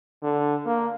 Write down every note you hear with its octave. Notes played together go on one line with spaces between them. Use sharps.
D3
A#3